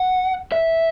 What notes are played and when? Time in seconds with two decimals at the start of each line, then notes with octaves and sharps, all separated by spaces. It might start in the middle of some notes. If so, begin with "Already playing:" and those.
Already playing: F#5
0.52 E5